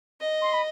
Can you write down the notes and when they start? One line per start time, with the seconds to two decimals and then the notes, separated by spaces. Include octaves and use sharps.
0.21 D#5
0.41 C6
0.53 B5